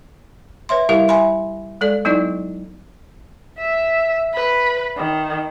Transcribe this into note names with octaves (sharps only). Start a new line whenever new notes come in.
B4 C#5 E5 C6
G3 E4 G4 A#4 E5 F5
E5 G#5 B5 C6
G#3 A4 D5
F#3 B3 D#4 E4 D5
E5
B4
D#3